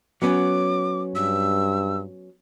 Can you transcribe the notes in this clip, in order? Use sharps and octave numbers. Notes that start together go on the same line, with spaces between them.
F#3 B3 C#4 D6
G2 E6